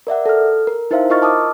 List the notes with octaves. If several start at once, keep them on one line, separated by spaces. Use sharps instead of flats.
A#4 D5 E5 F#5
A4 F6
A#4
D#4 E4 A#4 C5 E5 F5
F4 A#4 D#5 C#6 F6 A6
A5 D6 D#6 F6